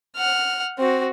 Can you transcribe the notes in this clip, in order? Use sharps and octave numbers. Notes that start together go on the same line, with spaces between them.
F#5 F6
C4 F#4